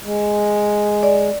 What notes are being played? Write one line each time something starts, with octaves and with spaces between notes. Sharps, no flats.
G#3
D5